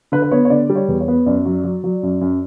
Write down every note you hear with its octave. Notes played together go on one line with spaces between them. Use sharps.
D3 B4
B4
B3 C#5
C#5
D3 D5
G3
C#5
E2
C#5
B3
F#2 D5
F#3
F#3
F#3
F#2
F#2